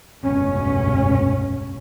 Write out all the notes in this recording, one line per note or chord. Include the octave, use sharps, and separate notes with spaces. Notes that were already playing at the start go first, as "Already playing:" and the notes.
F1 C#2 G2 B2 C#4